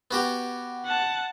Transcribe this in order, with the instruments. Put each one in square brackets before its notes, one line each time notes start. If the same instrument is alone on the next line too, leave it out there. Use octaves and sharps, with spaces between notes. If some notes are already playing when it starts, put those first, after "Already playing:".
[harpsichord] B3 F#4 G4
[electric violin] F#5 A5